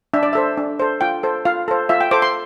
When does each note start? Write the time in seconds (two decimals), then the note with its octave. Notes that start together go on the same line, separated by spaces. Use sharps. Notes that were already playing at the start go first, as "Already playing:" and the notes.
0.13 D4 E5
0.23 D5
0.33 A4 C5 E5
0.57 D4
0.79 A4 C5
1.01 F4 G5
1.23 A4 C5
1.45 F4 F5
1.68 A4 C5
1.89 F4 E5
2.01 G5
2.11 A4 C5 D6
2.22 C6